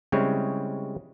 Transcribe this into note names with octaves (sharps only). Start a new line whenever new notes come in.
C#3 G3 G#3 C4 E4 C#5